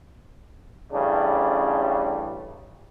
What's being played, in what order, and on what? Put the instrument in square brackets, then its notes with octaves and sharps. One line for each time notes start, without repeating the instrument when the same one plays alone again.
[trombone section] A1 C#3 G3 D4